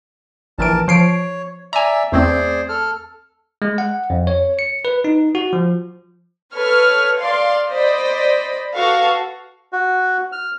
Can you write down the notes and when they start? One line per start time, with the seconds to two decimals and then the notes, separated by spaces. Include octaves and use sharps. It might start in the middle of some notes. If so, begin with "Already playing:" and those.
0.59 A#1 E3 A#4 A5 D7
0.88 F3 C#5 C7 D7
1.73 D5 E5 G#5 A#5
2.12 E2 A3 C4 G#4 C5 D5
2.69 A4 F6
3.62 G#3
3.78 F#5
4.10 F2
4.27 C#5
4.59 C#7
4.85 B4
5.04 D#4
5.35 F#4
5.53 F3
6.54 A4 B4 C#5 F6
7.21 D5 F5 C6
7.70 C5 D5 D#5 B5
8.75 F#4 A4 B4 F5 C#6
9.73 F#4
10.32 F6